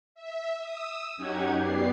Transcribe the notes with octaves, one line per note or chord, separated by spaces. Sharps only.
E5
D#6 E6
F#2 C#4 D#4 G4 F#5 G#6
F#2 B3 G4 D5 C7